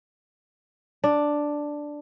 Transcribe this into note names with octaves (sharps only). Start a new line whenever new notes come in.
D4